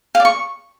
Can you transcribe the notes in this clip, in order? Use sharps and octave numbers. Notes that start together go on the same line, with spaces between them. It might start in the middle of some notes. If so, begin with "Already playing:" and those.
F5
D5
C#6